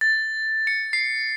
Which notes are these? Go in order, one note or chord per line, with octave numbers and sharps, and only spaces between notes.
A6
C#7
C7